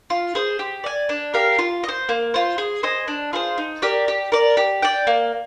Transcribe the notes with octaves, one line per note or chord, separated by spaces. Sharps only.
F4
G#4 C5
G4
D5 G#5
D4
G4 A#4 F5
F4
D#5
C5
A#3
F4 C5
G#4
C5 D#5 G#5
D4
F4 G#4 C5
D#4
G4 A#4 D5
G4
A#4 D5
G4
D5 G5
A#3